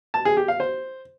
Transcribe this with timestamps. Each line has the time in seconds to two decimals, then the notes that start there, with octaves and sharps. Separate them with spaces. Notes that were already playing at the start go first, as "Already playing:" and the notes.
0.14 A5
0.25 G#4
0.37 G4
0.48 F5
0.60 C5